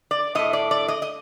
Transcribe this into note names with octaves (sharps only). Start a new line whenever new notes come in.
D5
A2 A3 D#5
D5
D5
D#5
D#5